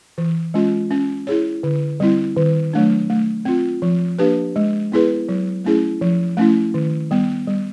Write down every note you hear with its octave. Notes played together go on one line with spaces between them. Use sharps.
E3
G#3 C#4 F4
C#4
E4 G#4 C#5
D3
G3 C4 E4
D#3
F#3 A3 D4
A3
C4 F4
F3
A#3 D4 G4 B4
G#3
B3 E4 G#4 B4
F#3
A3 C#4 E4 G#4
F3
A3 C#4 E4
D#3
G3 B3
G3